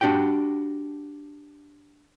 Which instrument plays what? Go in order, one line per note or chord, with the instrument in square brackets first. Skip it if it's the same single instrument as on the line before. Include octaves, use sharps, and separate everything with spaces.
[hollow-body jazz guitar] D4 F#4 G4 G5